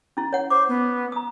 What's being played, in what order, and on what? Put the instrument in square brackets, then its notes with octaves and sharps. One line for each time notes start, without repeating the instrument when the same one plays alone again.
[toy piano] C#4 E4
C#5 F#5
[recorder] C5 [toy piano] D6
[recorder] B3
[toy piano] A#5 D#6